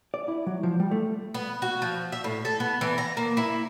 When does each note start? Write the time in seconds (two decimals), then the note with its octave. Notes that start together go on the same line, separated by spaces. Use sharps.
0.14 D5
0.28 E4
0.46 F#3
0.63 F3
0.80 G3
0.91 A3
1.34 B3
1.62 F#4
1.82 F3
2.12 E5
2.24 A2
2.45 A4
2.60 B3
2.81 E3
2.98 A#5
3.17 A#3
3.37 E4